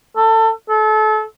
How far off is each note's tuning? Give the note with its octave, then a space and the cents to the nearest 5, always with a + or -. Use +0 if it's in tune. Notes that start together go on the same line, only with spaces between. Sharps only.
A4 +25
A4 -30